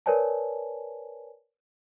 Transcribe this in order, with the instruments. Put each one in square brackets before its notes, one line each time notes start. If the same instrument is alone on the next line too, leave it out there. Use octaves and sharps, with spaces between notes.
[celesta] A#4 B4 C#5 D5 G#5 A5